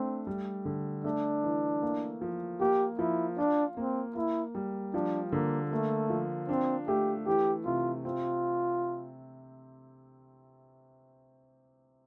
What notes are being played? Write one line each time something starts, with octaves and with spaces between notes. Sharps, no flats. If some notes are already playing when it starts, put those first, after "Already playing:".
Already playing: A3 C4 D4
G3
D3
A3 D4
E3
A#3
F3
A#3 G4
F3 E4
D4 F4
A#3 C4
A#3 E4
G3
F3 D4
D3 A#3
A3 A#3
F3
C4 D4
A3 G4
E3 G4
C3 F4
C4 F4